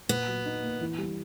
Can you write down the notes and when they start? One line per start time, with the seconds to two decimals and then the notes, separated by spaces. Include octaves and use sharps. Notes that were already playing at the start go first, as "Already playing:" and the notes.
0.09 A#2 B3
0.27 F#3
0.46 D#4
0.63 A#3
0.81 E3
0.98 G3